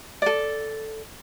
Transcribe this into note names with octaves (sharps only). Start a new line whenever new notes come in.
A4 D5